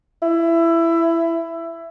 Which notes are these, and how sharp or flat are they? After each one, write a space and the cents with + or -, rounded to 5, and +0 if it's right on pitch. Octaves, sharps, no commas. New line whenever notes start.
E4 +15